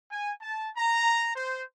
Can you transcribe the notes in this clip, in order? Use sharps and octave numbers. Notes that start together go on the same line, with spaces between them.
G#5
A5
A#5
C5